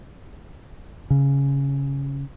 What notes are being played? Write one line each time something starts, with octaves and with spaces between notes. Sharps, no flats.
C#3